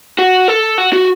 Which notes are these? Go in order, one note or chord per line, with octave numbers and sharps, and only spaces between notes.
F#4
A4
F#4
F#4